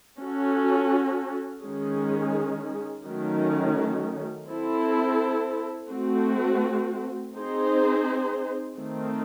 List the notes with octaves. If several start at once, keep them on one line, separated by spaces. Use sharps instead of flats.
C#4 F#4 A4
D#3 G#3 C#4 G#4
D#3 F#3 A3 C#4
C4 E4 A4
A3 C4 F#4
C4 D#4 G#4 C5
D#3 A3 C4